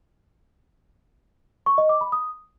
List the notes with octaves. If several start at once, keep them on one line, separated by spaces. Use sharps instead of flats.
C#6
D#5
D6
B5
D#6